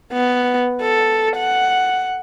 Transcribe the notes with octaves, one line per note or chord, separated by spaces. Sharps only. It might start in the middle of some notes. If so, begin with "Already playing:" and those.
B3
A4
F#5